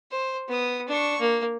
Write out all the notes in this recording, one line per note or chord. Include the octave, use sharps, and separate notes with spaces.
C5
B3 D#6
D4 C#6
A#3